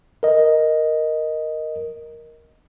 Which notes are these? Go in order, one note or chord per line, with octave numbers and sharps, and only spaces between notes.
A#4 D#5